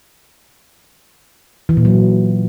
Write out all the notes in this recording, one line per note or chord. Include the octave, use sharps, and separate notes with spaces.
E3
A#2
F#3